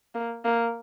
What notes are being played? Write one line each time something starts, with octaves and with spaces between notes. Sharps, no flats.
A#3
A#3